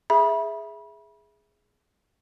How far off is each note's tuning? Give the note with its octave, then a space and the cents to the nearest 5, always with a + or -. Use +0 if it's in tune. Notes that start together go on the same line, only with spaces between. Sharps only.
G#4 +0 E5 +0 B5 -30